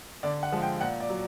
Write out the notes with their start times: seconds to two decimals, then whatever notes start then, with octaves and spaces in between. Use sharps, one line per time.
0.23 D3 D5
0.43 F#5
0.52 F3 G#3
0.62 G5
0.81 A#2 F#5
1.00 D5
1.10 F#3